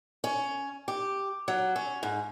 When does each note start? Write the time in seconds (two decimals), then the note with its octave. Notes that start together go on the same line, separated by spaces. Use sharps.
0.24 C#4
0.88 G4
1.48 F#3
1.76 C#4
2.03 G#2